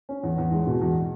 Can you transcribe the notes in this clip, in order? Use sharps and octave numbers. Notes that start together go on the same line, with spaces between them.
C#4
E2
E2
G#3
B2
E2